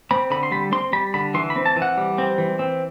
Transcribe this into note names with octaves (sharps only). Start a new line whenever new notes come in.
C4 B5
D3 B5
C6
G3 B5
C4 C6
G3 B5
D3 B5
E3 C6
B5
C4
A5
E3
F#5
G3
C4
E3
C4